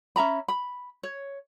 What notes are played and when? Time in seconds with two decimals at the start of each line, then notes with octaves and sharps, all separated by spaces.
0.16 C#4 E5 A#5 B5
0.48 B5
1.03 C#5